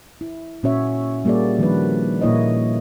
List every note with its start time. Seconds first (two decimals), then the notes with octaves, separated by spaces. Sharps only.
0.21 E4
0.63 A#2 C#4 F#4 C#5 E5
1.25 G3 A#3 F#4 G#4 D5
1.59 D#3 F3 G3 D4 F#4 B4
2.21 A#2 A#3 E4 C#5 D#5